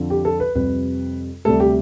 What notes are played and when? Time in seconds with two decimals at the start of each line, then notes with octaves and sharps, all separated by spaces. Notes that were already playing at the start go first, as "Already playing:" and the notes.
Already playing: F2 D3 F3
0.10 G4
0.25 A4
0.40 B4
0.55 F2 C3 G3 B4
1.45 D2 C3 G3 A4
1.60 G4